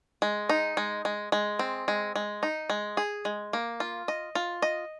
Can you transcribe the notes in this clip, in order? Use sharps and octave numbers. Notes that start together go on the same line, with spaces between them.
G#3
D#4
G#3
G#3
G#3
C4
G#3
G#3
D#4
G#3
G#4
G#3
A#3
F4
D#5
F4
D#5